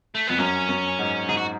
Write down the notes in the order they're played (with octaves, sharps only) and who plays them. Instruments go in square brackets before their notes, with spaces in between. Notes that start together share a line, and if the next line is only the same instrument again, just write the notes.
[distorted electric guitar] A3
[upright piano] F2 [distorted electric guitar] B3
[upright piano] F#2 [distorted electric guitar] C#4
[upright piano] F#2
G#2
[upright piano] G#2 [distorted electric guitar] G#4
[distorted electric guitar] F#4